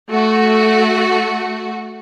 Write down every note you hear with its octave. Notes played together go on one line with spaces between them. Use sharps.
A3 F#4